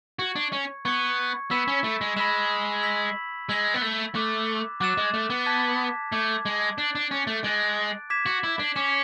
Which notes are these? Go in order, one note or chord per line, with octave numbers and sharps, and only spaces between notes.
F#4 C#6 G#6 C#7
D4
C#4
B3 C#6 G#6 C#7
B3 B5 E6 B6 E7
C#4
A3
G#3
G#3 B5 E6 B6 E7
E6 G#6 B6 F#7
G#3 E6 G#6 B6 F#7
B3
A3
A3 D6 F#6 A6 E7
F#3 D6 F#6 A6 E7
G#3
A3
B3
A5 D6 G#6 B6
A3 A5 D6 G#6 B6
G#3
D4 F#6 A6 D7
D4
C#4
A3
G#3 F#6 A6 D7
D6 G#6 B6 E7
F#4
E4
D4
C#4 D6 G#6 B6 E7